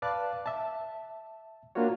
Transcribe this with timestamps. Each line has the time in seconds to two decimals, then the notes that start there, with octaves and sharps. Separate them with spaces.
0.02 B4 D5 F5 A5 D6 F#6
0.46 E5 A5
1.75 A#3 D4 F4 F#4 C#5